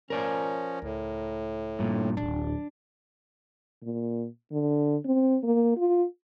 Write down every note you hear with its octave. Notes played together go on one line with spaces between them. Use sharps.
F3 C#4 A#4 D5 G#5
C#2 A2
G2 A#2 D4
D1 A1 D4
A#2
D3
C4
A#3
F4